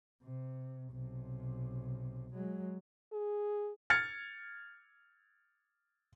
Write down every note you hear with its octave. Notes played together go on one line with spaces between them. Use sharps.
C3
B1 C3
F#3 G#3
G#4
F6 G#6 A6 C#7